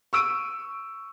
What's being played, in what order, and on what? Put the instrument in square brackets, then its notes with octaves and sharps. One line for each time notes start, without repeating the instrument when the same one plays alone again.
[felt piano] C#6 E6 D7 D#7